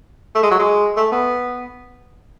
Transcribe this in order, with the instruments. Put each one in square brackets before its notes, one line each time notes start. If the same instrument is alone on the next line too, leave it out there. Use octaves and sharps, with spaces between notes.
[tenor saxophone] A3
G#3
F#3
G#3
A3
B3